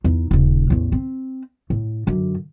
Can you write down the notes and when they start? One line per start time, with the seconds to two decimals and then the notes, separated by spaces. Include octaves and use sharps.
0.04 E2 D#4
0.31 D#1 C#3
0.70 A1 E2
0.92 C4
1.70 A2
2.07 F#2 D3